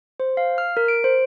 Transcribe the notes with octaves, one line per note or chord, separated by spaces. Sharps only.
C5
F5
F6
A#4
D7
C5